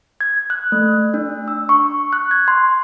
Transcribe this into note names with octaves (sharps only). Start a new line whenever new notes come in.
G#6
F#6
A3
D4
E6
C#6
F#6
G#6
C6